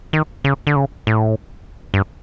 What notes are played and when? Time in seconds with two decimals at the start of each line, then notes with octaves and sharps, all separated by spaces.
0.13 D#3
0.44 C#3
0.67 D3
0.76 C#3
1.07 A2
1.94 G2